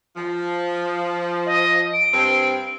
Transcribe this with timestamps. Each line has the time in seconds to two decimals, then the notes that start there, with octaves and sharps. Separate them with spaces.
0.16 F3
1.46 D#5
1.94 D7
2.12 G2 C4